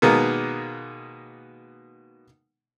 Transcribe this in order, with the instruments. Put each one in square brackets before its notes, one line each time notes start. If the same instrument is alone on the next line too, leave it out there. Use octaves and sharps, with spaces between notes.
[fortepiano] B2 D#3 G#3 A#3 B3